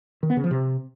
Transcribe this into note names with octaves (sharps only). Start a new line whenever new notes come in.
D#3
B3
C#3
F3
C3